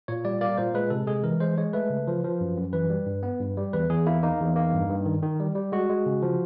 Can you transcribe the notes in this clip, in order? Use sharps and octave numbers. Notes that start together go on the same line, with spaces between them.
A#2 C#5
G3 D5
A#3 D5
A#2 C5
G#3 B4
C3 A4
G#3 G#4
E3 A#4
G#3 C5
G#3 C#5
A3 B4
C#3
F3
F3
F#2
F#2
E3 B4
G3
G2
B3
G2
G3
E2 B4
E2 G#4
A#3 E4
A#3 D#4
E2
A#3
G2
G2
D#3
D#3
G3
G3
G#3 F#4
G#3
C#3
F3